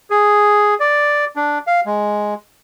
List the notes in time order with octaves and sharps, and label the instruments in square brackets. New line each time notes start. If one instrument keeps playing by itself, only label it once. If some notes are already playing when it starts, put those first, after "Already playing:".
[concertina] G#4
D5
D4
F5
G#3